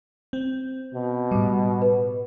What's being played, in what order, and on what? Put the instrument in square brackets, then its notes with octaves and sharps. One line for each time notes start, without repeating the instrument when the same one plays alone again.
[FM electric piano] C4
[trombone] B2
[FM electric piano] A2 G3
[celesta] B4